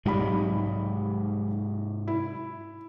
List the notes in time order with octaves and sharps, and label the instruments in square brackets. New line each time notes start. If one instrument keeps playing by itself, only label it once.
[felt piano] B1 G3 B5 [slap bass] G#2 C3 G#3
[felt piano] E4